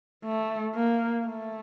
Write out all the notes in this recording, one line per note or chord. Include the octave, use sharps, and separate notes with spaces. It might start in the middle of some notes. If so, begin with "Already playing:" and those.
A3
A#3
A3